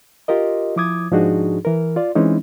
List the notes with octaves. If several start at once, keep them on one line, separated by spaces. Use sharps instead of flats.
F4 G4 A#4 D#5
F3 E4 D6 D#6 G#6
G#2 F3 D4 D#4 F#4 G#4
E3 A#4
F4 D5
E3 G#3 C4 C#4 D#4 E4